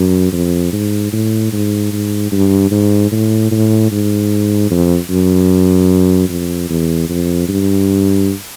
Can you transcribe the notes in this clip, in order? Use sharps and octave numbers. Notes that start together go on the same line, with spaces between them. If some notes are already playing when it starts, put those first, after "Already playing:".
Already playing: F#2
F2
G#2
A2
G#2
G#2
G2
G#2
A2
A2
G#2
F2
F#2
F2
E2
F2
G2